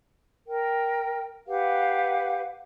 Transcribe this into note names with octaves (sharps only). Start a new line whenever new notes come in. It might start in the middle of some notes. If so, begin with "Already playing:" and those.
A#4 G5
G4 B4 F5 F#5